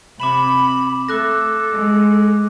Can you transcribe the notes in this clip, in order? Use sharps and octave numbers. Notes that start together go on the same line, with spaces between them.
C3 B5 D6 E7 F#7
A3 A4 D6 F#6 A#6
G#3